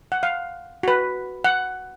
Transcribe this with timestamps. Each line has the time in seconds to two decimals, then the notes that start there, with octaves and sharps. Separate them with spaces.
0.12 F#5
0.23 F5
0.83 F#4 B4
1.44 F#5